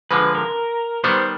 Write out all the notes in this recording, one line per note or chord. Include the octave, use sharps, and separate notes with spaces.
D3 F3 G#3 B4
A#4
D#3 G3 B3 C5